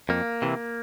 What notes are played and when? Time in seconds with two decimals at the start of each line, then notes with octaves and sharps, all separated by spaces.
0.09 F2 A#3
0.42 C3 E3